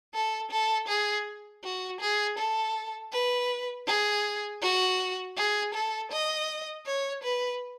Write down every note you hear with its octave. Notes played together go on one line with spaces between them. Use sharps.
A4
A4
G#4
F#4
G#4
A4
B4
G#4
F#4
G#4
A4
D#5
C#5
B4